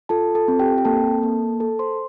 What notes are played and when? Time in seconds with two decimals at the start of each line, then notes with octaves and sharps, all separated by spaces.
0.09 F4 A4 A5
0.35 A4 A5
0.48 C4
0.59 G4 G5
0.78 G5
0.85 A#3 A4 A5
1.23 A#3
1.60 A4 A5
1.79 C5 C6